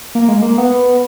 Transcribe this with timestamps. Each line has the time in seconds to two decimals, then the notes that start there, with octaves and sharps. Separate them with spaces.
0.15 A#3
0.28 G#3
0.42 A#3
0.58 B3